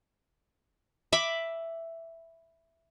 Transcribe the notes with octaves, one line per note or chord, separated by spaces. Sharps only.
E5 B5 D6